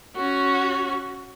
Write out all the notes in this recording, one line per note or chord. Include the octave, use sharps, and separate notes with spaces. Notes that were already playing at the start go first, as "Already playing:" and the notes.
C#4 F#4